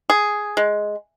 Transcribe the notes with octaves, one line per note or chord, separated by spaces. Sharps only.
G#4
G#3